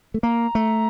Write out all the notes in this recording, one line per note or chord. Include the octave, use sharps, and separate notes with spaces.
A3
A#3 A#5
A3